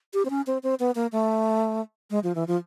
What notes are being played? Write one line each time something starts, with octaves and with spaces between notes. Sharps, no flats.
G4
C4
C#4
C4
C4
B3
A#3
A3
G#3
F3
E3
F3